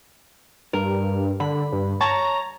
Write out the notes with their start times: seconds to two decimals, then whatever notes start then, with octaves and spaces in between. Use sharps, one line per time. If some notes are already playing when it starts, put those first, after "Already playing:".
0.73 G2 A#4
1.40 D3 B5
1.73 G2
2.01 C#5 A5 A#5 C#6